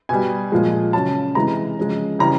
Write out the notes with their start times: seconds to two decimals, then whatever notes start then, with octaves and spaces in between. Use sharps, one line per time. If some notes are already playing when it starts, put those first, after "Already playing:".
0.09 B2 G3 G#5
0.52 A#2 F3 G#3
0.93 C#3 F#3 A5
1.35 C3 E3 G#3 A#5
1.78 C#3 F3 G#3
2.19 C#3 E3 G3 A#5